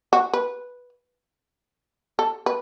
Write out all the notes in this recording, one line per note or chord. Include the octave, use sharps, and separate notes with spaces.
F#4
B4
A4
B4